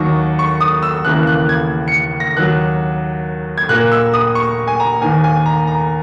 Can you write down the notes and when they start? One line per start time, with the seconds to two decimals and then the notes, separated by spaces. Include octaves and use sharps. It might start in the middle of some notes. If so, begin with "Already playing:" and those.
Already playing: D#2 D#3 F#3 C#6
0.39 C#6
0.61 D#6
0.83 E6
1.05 D#2 C#3 E3 A#3 F#6
1.27 F#6
1.49 G#6
1.88 C#7
2.20 A#6
2.37 D#2 D#3 F#3 F#6
3.58 G#6
3.69 A#2 A#3 F#6
3.92 E6
4.14 D#6
4.35 C#6
4.67 G#5
4.80 A#5
5.02 D#2 D#3 A#3 G#5
5.24 G#5
5.46 A#5
5.67 A#5